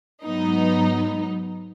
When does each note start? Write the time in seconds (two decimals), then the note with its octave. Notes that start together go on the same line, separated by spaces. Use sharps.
0.25 G#2 F#3 B3 D#4